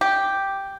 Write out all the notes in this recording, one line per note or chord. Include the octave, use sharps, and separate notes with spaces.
G4